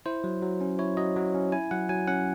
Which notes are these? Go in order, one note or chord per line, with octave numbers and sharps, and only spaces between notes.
E4 C5
F#3
F#3
C#4
E4 C#5
F#3 D#5
F#3
C#4
E4 G#5
F#3 F#5
F#3 G#5
C#4 F#5